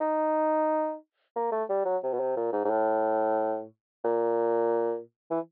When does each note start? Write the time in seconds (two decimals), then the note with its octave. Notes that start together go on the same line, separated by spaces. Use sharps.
0.01 D#4
1.36 A#3
1.52 A3
1.69 G3
1.85 F#3
2.03 C3
2.13 B2
2.20 C3
2.36 A#2
2.53 G#2
2.65 G#2
2.70 A2
4.05 A#2
5.30 E3